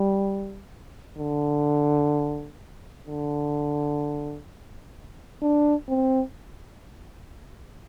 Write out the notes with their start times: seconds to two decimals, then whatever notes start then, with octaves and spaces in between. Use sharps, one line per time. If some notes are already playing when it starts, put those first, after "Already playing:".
Already playing: G3
1.18 D3
3.07 D3
5.42 D4
5.89 C4